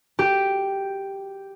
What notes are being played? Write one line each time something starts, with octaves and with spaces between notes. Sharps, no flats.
G4